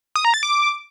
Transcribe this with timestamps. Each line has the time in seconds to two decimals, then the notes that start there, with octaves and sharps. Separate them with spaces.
0.16 D#6
0.25 A#5
0.34 A6
0.43 D6